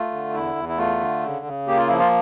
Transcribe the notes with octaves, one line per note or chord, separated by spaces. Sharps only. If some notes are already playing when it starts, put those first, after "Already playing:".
Already playing: A3 F4
D3
E2 E4
E2
E4
A3 F4
D3
C#3
C#3
A#3 G4
F4
F3 E4
F4